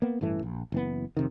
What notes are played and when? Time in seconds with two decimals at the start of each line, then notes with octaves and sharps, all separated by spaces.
0.02 A#3 B3
0.21 A1 G2 E3 A3
0.43 A#1
0.72 F#1 E3 B3
1.17 F2 C3 D#3